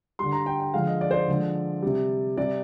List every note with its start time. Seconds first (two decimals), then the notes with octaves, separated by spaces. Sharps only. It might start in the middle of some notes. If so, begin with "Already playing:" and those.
0.19 D3 G3 C6
0.32 A#5
0.46 G5
0.60 G5
0.74 D3 F3 G#3 F5
0.87 D#5
1.01 D5
1.11 C5
1.14 D5
1.28 D3 F3 G#3
1.82 C3 G3
2.37 C3 G3 D5